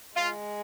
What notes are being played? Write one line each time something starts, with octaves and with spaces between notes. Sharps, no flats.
G#3 F4